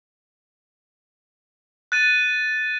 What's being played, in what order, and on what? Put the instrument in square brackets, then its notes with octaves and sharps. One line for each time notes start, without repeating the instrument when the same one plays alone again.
[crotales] F#6 A6 D#7